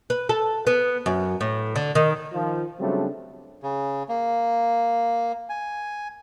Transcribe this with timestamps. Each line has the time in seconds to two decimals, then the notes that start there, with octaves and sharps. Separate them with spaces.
0.10 B4
0.29 A4
0.67 B3
1.06 F#2
1.41 A2
1.76 D3
1.95 D#3
2.33 D#3 F3
2.80 C#3 F#3 G3 A3 C4 D4
3.63 C#3
4.09 A#3
5.49 G#5